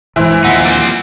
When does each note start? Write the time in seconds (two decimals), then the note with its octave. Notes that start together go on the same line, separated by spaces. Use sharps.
0.16 A#1 G#2 E3 E4 C5
0.44 D#2 A#2 F3 G#3 D#4 F#5 E6 B6
0.64 G3 C4